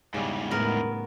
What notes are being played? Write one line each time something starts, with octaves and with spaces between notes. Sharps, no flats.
E2 G#2 C#3 G3
A2 D#3 B3 A#4